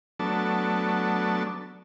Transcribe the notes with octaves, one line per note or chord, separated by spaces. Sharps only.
F#3 A3 B3 D4 A5